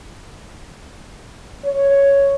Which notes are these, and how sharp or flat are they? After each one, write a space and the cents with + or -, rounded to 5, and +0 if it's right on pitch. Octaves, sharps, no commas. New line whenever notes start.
C#5 +5